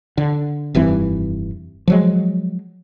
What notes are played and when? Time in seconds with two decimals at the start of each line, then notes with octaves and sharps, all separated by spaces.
0.18 D3
0.75 F1 G2 E3 C4
1.88 F3 F#3 G#3